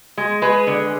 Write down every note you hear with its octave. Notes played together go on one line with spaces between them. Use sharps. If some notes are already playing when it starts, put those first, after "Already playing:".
G#3
G#3 G#4 B4
D3